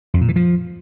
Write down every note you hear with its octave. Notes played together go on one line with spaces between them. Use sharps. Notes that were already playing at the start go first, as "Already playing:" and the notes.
F2
A#2
E3
F3